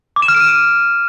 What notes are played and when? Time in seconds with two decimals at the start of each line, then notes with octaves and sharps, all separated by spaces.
0.16 D6
0.22 E7
0.28 F6
0.34 D7
0.40 D#7